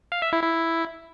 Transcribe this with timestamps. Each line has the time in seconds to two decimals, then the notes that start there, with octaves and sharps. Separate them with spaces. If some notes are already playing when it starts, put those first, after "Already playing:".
0.12 F5
0.22 E5
0.33 E4
0.43 E4